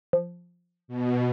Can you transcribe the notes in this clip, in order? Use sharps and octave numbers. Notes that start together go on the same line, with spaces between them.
F3
B2